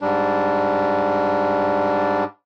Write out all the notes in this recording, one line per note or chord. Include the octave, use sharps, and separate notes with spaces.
G#2 G3 D4